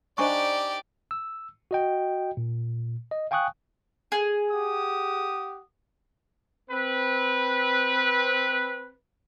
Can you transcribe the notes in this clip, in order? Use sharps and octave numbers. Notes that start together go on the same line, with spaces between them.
D4 D#4 G4 C5 D5 D#5 G#5 C#6
E6
F#4 D#5 G5
A#2
D#5
F5 G5 G#5 C#6 D#6 F#6
G#4
G4 F#5 D#6
C4 B4